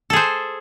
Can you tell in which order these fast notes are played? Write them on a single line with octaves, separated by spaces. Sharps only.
A4 G#4 C5